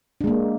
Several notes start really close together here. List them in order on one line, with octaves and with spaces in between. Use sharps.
D4 G#3 A#3